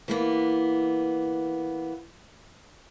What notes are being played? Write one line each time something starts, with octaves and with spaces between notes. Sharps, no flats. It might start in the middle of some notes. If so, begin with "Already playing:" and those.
E3 A#3 B3